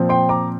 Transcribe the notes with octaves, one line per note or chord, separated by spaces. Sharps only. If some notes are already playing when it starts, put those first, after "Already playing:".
Already playing: A#2 F3 C4
G5 C6
A#5 D6